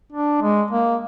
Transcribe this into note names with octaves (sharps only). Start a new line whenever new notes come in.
D4
G#3
A#3